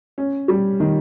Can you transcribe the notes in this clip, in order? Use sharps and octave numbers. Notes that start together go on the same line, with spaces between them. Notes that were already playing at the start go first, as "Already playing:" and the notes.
C#4
G3
D#3